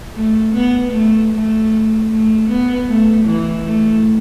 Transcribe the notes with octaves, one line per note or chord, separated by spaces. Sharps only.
A3
B3
A3
A3
A3
B3
A3
E3
A3